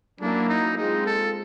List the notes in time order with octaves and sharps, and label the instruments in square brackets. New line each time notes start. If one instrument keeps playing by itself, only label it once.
[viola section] F#3 A#3 C#4 E4 [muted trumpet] D4
[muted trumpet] D#4
[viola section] G#3 C4 F4 [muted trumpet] D#4
[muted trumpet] A4